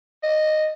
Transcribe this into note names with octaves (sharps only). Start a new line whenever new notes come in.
D#5